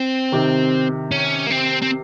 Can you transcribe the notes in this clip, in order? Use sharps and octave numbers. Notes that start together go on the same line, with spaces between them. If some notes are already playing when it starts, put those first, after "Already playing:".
Already playing: C4
C3 D#3
C#4
A#3
C4
C4